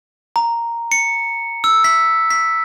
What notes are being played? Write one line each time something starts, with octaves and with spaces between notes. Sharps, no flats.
A#5
C#7
E6
B6
B6